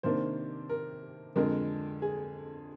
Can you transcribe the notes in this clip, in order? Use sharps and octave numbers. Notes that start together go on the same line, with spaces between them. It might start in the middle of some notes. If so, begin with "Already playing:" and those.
C3 D#3 A#3 D4 C5
A#4
F2 D3 G#3 A#4
G#4